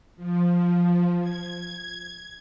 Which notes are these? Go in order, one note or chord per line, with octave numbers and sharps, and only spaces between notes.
F3
G#6